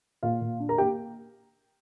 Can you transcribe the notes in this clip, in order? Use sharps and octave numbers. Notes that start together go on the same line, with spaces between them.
A#2 F4 F5
A#2
D4
A#4 A#5
A#3 G4 G5